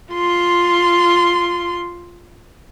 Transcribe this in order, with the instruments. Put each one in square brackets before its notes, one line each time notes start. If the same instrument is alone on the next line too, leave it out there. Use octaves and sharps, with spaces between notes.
[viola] F4 C6